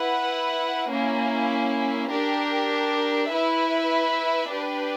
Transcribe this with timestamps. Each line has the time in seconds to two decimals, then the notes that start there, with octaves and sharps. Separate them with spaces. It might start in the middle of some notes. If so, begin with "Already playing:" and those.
Already playing: E4 B4 F#5
0.91 A#3 C#4 E4
2.11 D4 G4 A#4
3.31 E4 B4 E5
4.50 D4 G4 B4